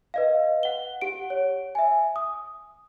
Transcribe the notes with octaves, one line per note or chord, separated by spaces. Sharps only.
B4 D#5 F5
F#5 G7
G4 F#5 D7
C#5
E5 G#5
D#6